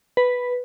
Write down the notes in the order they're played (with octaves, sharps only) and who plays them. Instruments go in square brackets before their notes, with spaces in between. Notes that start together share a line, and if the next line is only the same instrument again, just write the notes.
[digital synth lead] B4